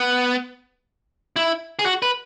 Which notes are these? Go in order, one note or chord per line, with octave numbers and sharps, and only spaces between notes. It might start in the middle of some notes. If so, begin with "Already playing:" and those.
Already playing: B3
E4
G#4
F#4
B4